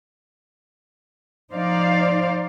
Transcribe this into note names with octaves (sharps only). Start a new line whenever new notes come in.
F3 D#4 C5 D5 F5